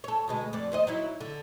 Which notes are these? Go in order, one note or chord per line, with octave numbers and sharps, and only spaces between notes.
A4 C#5
D2 B2 G#3
F2 D5
D#2 C5 D#5
F#3 D#4 E4
D3